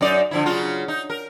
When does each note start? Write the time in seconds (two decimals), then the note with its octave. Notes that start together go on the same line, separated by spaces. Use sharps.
0.01 F#2 D#4 D5
0.31 D3 F3 E4
0.46 C#3 F#3 F4
0.88 D#4
1.10 A#4